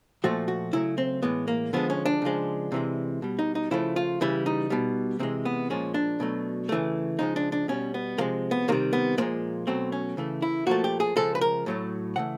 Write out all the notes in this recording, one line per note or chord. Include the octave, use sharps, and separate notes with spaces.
A#2 F3 A3 F#4
F#4
C#3 F#3 A3 E4
C4
A2 E3 G#3 B3
A#3
D3 F3 G#3 B3
C#4
D4
C#3 F3 G#3
C3 E3 G#3
B2 G3
D#4
D#4
C#3 F3 A3 E4
F4
C#3 E3 G3 E4
D#4
B2 G3
C3 E3 G#3 C4
B3
A#2 F3 G#3 C#4
D4
B2 F#3 A3
C#3 E3 A3
C#3 F3 G#3 D#4
D4
D4
B2 G3 C#4
B3
C3 F3 G#3 A#3
B3
C3 D#3 G3 A#3
B3
A#2 F3 G#3 B3
B2 F#3 A3 C4
C#4
C#3 E3 A3
E4
A#2 F3 A3 F#4
G4
G#4
C#3 F3 G#3 A4
B4
A#4
A2 F#3 A3
C#3 E3 A3 F#5